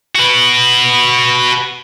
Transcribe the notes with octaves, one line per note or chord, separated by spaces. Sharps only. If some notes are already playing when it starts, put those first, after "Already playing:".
F#4 B4